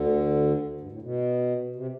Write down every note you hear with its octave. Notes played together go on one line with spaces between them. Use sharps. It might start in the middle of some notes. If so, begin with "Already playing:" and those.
Already playing: D2 D3
G2
A2
B2
C3